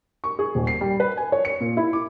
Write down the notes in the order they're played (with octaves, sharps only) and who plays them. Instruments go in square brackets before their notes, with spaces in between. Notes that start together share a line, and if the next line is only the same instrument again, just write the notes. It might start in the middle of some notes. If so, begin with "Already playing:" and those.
[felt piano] C#6
G#4
D#1
C7
G3
B4
G#5
C#5
C#7
A#2
E4
D6